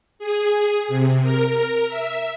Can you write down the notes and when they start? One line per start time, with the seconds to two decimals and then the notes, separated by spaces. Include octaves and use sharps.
0.19 G#4
0.88 C3
1.22 A#4
1.88 E5